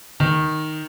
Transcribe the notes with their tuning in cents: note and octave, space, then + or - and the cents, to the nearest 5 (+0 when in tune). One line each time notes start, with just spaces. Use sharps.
D#3 +0 D#4 +0